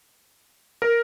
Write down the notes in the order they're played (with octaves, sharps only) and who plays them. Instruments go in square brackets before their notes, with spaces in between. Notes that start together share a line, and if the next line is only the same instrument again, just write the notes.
[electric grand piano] A#4